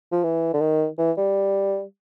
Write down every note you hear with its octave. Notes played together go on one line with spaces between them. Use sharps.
F3
E3
D3
D#3
E3
G3